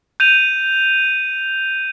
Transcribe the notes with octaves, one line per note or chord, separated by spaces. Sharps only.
G6 D#7 F7